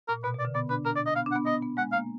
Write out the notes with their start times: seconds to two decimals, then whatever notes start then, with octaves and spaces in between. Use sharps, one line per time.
0.08 A#2 A#4
0.24 B2 B4
0.35 B2 D5
0.45 D3
0.55 B3 D5
0.69 D4 B4
0.85 D4 A#4
0.96 D4 D5
1.06 D#5
1.16 B3 F5
1.26 D4
1.31 F#5
1.36 B3
1.46 B3 D#5
1.62 B3
1.77 G#3 F#5
1.92 A#3 F5